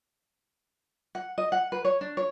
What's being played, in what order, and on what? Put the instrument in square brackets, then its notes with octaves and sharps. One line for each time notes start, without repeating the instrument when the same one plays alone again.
[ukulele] F#5
D#5
F#5
B4
C#5
D4
C#5